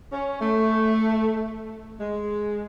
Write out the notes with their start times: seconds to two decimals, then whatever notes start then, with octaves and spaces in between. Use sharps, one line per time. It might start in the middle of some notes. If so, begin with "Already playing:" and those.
0.12 C#4
0.41 A3
2.00 G#3